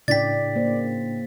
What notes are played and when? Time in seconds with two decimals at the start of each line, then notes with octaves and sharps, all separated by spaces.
0.08 A2 C#3 D4 E4 D5 G5 A6 B6
0.56 A#3 C5